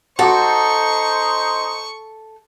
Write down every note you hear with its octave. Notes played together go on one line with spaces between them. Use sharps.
D#4 F#4 A4 C5 C#6 D6